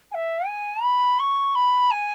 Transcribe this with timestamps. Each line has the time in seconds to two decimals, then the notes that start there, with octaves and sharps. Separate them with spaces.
0.11 G#5
0.14 E5
0.46 G#5
0.82 B5
1.19 C#6
1.55 B5
1.90 G#5